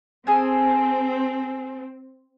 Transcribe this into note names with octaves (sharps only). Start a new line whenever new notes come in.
C4 G#4 A4 G#5